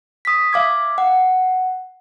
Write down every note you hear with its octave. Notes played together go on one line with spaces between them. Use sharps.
D#6 B6
E5 F5 D6 G#6
F#5